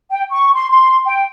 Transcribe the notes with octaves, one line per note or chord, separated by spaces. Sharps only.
G5
C#6
C6
C6
G5